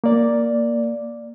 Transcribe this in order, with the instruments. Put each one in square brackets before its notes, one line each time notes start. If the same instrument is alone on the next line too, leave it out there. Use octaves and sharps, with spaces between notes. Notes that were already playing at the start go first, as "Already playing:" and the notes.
[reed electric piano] A#3 D5